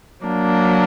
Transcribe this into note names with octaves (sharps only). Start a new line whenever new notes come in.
F#3 A#3 D4